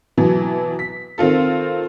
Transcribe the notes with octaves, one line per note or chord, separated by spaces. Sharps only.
B2 E3 F#3
B6
D#3 C4 F4 A4